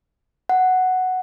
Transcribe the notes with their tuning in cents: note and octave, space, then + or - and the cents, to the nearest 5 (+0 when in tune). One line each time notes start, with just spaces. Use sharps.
F#5 +0